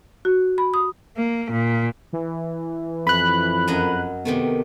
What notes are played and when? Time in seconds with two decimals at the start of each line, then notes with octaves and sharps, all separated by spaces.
0.25 F#4
0.58 B5
0.74 D#6
1.17 A#3
1.51 A#2
2.13 E3
3.07 F2 B4 B5 F#6
3.68 F#2 D#5 A#5
4.25 C3 D#3 A3 B3